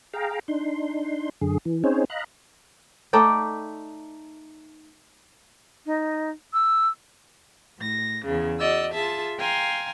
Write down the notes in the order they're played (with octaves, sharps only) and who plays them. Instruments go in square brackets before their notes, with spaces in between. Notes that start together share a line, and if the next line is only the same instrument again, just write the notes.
[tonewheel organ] G#4 F5 G5 A#5
D4 D#4 C6
F#2 D3 G#4
E3
C4 C#4 D#4 G#4 C5 C#5
D#5 F5 A#5 B5 F#6
[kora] A3 D#4 D5 G5
[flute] D#4
E6
[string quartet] A2 A#6
E2 C#3
F#4 D5 D#5 E6
F4 G#4 E5 A5
F5 G5 G#5 A#5 C6